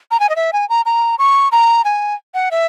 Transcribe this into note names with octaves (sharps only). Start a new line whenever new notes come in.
A#5
G#5
D#5
E5
G#5
A#5
A#5
C#6
A#5
G#5
F#5
E5